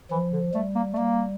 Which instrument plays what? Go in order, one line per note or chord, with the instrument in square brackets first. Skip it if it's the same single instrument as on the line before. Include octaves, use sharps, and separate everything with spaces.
[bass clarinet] E3 [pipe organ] F3
[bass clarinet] D3
[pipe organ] G3 [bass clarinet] A3
[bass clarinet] A#3
A3
[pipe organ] G3 [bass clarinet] A#3